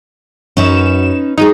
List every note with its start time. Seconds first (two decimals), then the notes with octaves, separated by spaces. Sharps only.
0.57 F#2 C#4 D#4 B4 E7
1.38 F#3 G#3 D#4 G#4